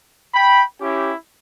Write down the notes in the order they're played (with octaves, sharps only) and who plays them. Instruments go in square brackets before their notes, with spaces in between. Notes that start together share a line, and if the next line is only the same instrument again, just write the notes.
[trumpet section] G5 B5
C#4 E4 G4